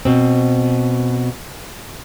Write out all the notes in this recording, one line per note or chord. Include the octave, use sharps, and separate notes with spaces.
B2 C4